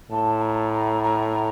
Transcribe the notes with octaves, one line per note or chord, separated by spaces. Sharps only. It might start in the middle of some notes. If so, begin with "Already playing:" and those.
A2 A5
A#5
A#5
A#5